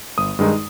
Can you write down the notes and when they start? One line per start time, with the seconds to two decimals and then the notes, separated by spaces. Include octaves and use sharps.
0.18 G1 D#6
0.39 G2 D#3 G#3 D#4